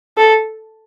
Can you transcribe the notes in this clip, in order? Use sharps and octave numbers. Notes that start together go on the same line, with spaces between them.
A4